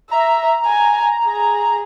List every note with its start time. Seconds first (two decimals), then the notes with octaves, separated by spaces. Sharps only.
0.11 E5 A#5
0.66 G#5
1.25 G#4